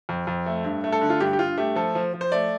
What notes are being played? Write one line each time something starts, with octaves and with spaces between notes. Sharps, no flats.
F2
F2
A3
G2
A3
A4
D3
F4
G2 G4
G4
G2 F4
A3 G4
F3 A4
F3
F3
C5
A3 D5